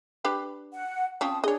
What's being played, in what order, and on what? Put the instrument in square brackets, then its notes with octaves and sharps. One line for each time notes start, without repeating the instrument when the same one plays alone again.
[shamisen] D4 G4 B4
[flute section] F#5
[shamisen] C4 C#4 F4 [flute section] A5 D#6
[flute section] D4 G#4 [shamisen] C#5 D#5